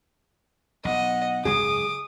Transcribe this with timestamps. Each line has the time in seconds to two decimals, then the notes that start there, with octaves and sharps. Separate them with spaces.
0.85 B1 D#5 F#5
1.45 F#1 C#2 G#2 G#4 D6 D#6